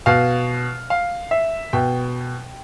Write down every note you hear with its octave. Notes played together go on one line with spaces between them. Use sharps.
B2 F5
F5
E5
B2 G5